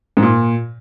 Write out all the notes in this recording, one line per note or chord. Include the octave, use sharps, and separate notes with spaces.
G#2
A#2